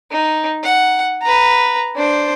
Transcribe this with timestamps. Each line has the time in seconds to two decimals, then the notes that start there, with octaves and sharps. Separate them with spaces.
0.11 D#4
0.64 F#5
1.22 B4 A#5
1.96 D4 C5